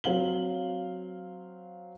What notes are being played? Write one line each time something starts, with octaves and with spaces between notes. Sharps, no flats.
F#3 C4 F5 F#7 G7